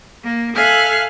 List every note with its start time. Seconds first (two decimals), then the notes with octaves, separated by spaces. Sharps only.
0.25 A#3
0.56 A4 E5 F5 G#5 F6 F#6